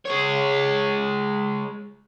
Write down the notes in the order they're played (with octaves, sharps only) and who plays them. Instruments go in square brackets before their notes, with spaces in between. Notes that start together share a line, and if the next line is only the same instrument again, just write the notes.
[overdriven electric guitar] G#3 C#5